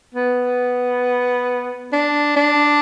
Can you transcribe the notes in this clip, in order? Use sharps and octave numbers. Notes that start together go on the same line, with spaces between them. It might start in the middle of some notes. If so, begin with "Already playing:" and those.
B3
D4
D4